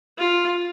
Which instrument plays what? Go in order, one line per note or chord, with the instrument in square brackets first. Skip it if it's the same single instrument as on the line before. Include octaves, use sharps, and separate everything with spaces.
[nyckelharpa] F4